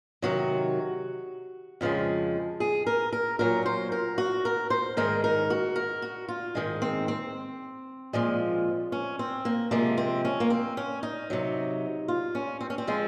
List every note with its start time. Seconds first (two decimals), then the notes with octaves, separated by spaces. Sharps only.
0.22 C3 D#3 F#3 F#4
1.81 F2 C#3 F3 G#3
2.60 G#4
2.87 A#4
3.12 A#4
3.39 A#2 F#3 A#4
3.66 C5
3.92 A#4
4.18 F#4
4.45 A#4
4.70 C5
4.97 G#2 D#3 G#3 A#4
5.24 A#4
5.50 F#4
5.76 A#4
6.02 F#4
6.28 F4
6.55 G#2 D#3 G#3
6.82 C4
7.08 C4
8.13 A#2 F3 G#3
8.92 C#4
9.19 C4
9.45 A#3
9.71 C3 F3 G#3 A#3
9.97 C4
10.25 C#4
10.40 A#3
10.50 C4
10.77 C#4
11.03 D#4
11.30 C3 F#3
12.08 F4
12.35 C#4
12.61 C4
12.70 C#4
12.78 C4
12.87 F3 G#3